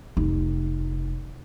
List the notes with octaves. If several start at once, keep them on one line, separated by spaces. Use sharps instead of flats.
F1 D#4